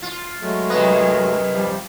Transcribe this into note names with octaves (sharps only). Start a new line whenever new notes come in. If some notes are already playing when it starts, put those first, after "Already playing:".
F4
F#3 G#3 A3
F#2 C3 A#3 B4 D#5
F3 G3